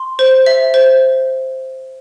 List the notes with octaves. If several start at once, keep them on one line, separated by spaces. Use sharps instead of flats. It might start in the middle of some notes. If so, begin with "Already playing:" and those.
Already playing: C6
C5
E5
C5